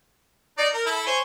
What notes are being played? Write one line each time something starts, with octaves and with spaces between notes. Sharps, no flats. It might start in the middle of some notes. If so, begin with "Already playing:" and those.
D#4 D5
A#4
E4 A4 B5
C5 C#5 G#5